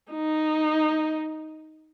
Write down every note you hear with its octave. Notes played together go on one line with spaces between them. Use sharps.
D#4